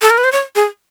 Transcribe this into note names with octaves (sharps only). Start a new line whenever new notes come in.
A4
A#4
B4
C5
C#5
G#4